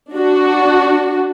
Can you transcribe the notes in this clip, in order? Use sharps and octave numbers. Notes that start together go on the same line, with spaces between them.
D4 F#4